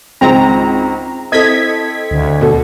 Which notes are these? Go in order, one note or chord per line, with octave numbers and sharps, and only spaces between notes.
G#1 C#2 G#3 C4 A#5
C4 E4 A4 D#5 G#6 B6
D2
B2 F#4 A4